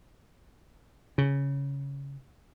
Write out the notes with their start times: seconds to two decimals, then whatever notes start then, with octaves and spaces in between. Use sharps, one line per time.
1.18 C#3